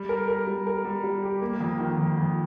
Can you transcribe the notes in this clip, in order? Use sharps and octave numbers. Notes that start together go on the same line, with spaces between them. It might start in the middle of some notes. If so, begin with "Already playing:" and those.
Already playing: G3
A#4
A#4
G3
A#4
G3
G3
G4
A#3
F2
D#3
F2
F2